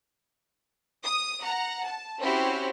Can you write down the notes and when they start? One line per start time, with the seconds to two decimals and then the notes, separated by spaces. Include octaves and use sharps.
1.03 D#6
1.40 F#5 A#5
1.84 A5
2.20 C4 C#4 E4 F#4 G4 C5